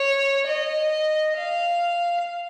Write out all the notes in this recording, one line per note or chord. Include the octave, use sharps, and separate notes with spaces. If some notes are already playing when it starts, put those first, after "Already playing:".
Already playing: C#5
D#5
F5